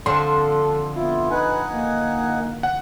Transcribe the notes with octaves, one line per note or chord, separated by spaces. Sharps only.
D3 F3 C4 A4 C6
B3 E4 F4
D#4 B4 F#5 G#5
A#3
F#5